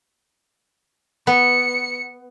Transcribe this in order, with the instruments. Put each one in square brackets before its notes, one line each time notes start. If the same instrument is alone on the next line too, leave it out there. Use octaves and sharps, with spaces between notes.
[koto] B3 [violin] C#7